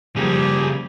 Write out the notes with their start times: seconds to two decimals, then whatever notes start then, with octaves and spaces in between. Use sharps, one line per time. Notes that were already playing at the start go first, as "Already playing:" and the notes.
0.16 C#3 F3 G3 A#3 G4 G#4